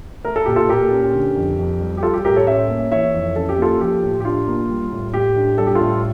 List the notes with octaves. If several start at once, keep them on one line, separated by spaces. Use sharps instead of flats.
A3 A#4
A4
A#2 G4
F4 A4
A#2 G4 A#4
C#4
D3
F2
F2
G3
G4
G3 F4 A4
G4
A2 G4 A#4
A4 C#5
C#4 C#5 E5
A#3
E3 C#5 E5
F2
C#4 A4
G4
A#3 F4 A4
F3 G4
A2
G4
D4 F4
A#3
G3
A2
A2 G4
D4
G3 A4
G4
A2 F4 A4